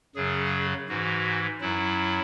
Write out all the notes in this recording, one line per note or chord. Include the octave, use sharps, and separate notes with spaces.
F#2 C#3 F#3 G#4
G#2 E3 F#4
F#2 F#3 E4